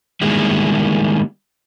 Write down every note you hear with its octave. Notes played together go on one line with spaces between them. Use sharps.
D#3 G3 G#3 A#3 B3 E4